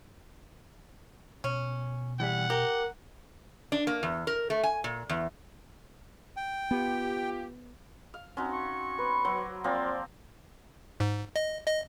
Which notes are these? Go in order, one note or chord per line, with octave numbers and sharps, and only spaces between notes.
B2 C#4
E3 G3 G4 F#5
G4 A#4
D4
A#3
E2
A#4
A3
G#5
A#2
E2
G5
B3 F4 G4
F5
C4 C#4 D#4 F#4
C#6
B3 B4 C5
F#3 C5 D6
F3 A#3 C4 D5
G#2
D#5
D#5